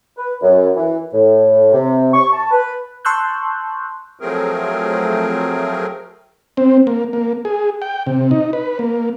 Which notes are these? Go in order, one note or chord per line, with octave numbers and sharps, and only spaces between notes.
B4
F#2
E3
A2
C3
C#6
A5
B4
A5 C6 C#6 E6 F#6 G6
F3 F#3 A3 C4 G#4 A#4
C4
A#3
A#3
G#4
G5
C3
D#4
B4
A#3